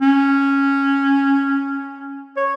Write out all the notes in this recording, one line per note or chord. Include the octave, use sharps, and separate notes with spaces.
C#4
C#5